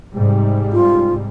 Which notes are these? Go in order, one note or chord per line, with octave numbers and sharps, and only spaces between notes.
G#2 C3 G3
F4